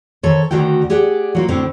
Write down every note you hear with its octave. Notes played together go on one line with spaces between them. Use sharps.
D#3 A4 C5 C#5
D2 D3 D#3 F#4 G5
G4 G#4 D5 F#5
F#3 A#3 F4
A2 D3 C4